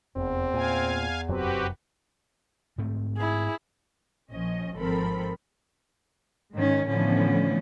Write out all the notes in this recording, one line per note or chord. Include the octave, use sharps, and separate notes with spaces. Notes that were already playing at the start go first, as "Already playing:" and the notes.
F1 E2 C4
A#2 F5 G#5
F1 F#2 F#3 C4 F#4 G4 B4
G#2 A3 C4
E4 G#4
A#1 F3 C#4 D#5
G#1 F3 C4 A4 A#4 B5
G#2 D#3 C#4
A2 D3 E3 F3 B3 C#4